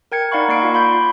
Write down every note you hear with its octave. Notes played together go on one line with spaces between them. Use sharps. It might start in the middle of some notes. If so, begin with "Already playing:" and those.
A#4 G5 G#6 C#7
D#4 D5 F5 F#5 B5 C#6
A#3 D5 C#6 C7 D7
F4 D5
B5 C6 G6